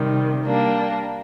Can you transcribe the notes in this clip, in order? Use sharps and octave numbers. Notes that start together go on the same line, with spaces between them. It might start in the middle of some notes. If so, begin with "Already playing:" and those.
Already playing: C3 D#3 G3
G3 A#3 D4